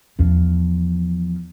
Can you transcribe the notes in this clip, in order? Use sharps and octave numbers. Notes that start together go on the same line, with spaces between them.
E2 F3